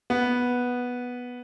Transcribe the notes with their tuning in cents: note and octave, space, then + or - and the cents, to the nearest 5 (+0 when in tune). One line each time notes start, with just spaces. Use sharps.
B3 -5